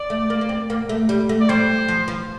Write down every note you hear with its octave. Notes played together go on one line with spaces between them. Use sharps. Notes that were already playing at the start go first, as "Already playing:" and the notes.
Already playing: D5
A3
A#3
A#3
C4
A#3
A3
G3
A3
D5
G3 C5
F3
F3